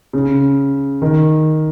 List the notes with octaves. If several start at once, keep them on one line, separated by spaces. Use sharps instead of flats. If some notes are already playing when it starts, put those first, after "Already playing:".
C#3
D#3